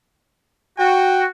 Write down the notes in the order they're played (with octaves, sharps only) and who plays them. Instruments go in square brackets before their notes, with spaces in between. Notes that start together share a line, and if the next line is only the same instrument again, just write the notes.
[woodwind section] F#4 [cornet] G5